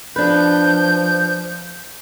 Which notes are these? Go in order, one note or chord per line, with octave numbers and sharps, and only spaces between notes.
F3 D4 B4 G6